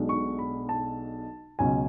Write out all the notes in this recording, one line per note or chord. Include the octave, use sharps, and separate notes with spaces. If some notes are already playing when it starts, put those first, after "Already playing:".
Already playing: B1 B2 G#3 D4
C#6
B5
A5
C#2 B2 F#3 C#4 G#5